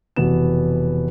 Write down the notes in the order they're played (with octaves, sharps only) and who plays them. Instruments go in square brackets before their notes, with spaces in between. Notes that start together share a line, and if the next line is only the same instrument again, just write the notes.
[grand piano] F1 B2 E3 B3 E7